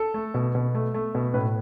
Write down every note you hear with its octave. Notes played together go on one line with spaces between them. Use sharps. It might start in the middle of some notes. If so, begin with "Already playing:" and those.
Already playing: A4
A3
B2
B2
A3
A3
B2
A2 B4